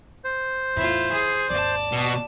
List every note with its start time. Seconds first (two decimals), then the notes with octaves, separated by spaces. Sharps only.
0.24 C5
0.76 E2 A2 E4 F4
1.12 D#2 G#4
1.50 G#1 D#2 D5 A5
1.92 B2